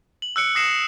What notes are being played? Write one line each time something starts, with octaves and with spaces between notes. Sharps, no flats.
F#7
E6 F#6 C#7 D7
D#6 A#6 C7 C#7 E7